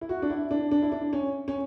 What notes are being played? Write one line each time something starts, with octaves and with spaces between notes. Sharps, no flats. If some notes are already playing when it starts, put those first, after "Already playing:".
E4
F#4
D4
E4
D4
D4
E4
D4
C#4
C#4